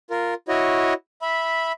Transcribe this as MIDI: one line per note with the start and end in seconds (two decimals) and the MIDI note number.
0.10 0.34 65
0.10 0.34 70
0.48 0.94 64
0.48 0.94 66
0.48 0.94 73
0.48 0.94 75
1.22 1.72 76
1.22 1.72 83